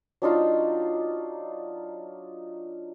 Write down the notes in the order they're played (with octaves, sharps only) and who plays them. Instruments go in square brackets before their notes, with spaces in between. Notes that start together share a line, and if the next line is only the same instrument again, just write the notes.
[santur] F#3 D4 D#4 F4